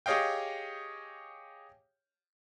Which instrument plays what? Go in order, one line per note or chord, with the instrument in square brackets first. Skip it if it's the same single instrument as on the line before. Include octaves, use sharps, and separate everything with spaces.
[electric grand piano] G4 G#4 C#5 D#5 F5 G5